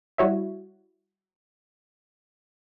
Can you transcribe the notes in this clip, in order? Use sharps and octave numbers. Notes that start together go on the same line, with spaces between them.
G3 E4 F#4 C#5 E5